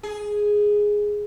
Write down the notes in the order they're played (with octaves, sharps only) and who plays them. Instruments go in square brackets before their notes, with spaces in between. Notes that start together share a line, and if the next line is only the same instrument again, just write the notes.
[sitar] G#4